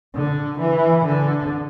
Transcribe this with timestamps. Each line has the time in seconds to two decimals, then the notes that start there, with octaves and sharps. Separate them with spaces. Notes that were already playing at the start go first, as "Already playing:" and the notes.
0.15 D3
0.60 E3
1.05 D3